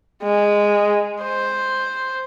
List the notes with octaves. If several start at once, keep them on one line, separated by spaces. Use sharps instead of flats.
G#3
C5